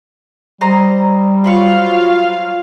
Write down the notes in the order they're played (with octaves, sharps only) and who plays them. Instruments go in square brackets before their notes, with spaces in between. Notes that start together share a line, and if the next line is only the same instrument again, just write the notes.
[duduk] G3 [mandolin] C5 D#5 A#5
[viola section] F#3 F4 F5 [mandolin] C5 B5 C#6